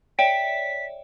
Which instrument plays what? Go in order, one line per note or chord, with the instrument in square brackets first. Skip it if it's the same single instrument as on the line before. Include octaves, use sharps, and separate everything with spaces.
[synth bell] C#5 D5 E5 [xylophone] G5 [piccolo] B6